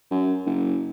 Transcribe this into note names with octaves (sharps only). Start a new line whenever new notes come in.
F#2
F#1